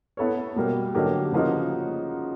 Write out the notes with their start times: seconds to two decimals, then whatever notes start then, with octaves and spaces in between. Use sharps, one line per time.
0.17 B3 E4 A4 C#5
0.56 B2 G3 A#3
0.94 D3 F#3 A#3 D#4 G4
1.32 C#3 F3 A#3 D#4 F#4